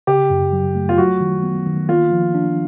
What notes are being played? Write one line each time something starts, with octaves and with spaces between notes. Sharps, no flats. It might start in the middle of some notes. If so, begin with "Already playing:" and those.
C#3 G4
F#2
F#3
A3
F4
F#3 F#4
D#3
B3
D#3
A#3 F4
F3
D4